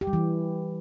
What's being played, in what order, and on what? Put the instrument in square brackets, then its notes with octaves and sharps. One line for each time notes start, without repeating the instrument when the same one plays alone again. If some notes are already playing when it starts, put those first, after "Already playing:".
[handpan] G4
G3
E3